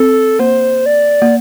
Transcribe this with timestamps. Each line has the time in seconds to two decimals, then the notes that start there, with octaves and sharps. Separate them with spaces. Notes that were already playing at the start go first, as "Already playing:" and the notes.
Already playing: C4 A4
0.39 A#3 C5
0.86 D5
1.22 A#3